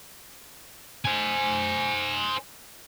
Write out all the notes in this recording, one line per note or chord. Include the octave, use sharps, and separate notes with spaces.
C5 G#5